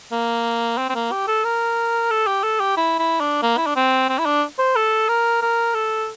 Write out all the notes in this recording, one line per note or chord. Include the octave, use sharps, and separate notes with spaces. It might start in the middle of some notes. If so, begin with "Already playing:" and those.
A#3
C4
C4
A#3
G4
A4
A#4
A4
G4
A4
G4
E4
E4
D4
A#3
E4
D4
C4
C4
E4
D4
C5
A4
A#4
A#4
A4